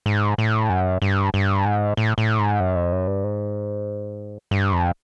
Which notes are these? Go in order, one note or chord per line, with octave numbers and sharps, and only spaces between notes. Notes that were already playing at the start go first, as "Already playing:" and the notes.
G#2
A2
F#2
G2
G2
G#2
A2
A2
G#2
F#2
F2
F#2
G2
G#2
G2
F2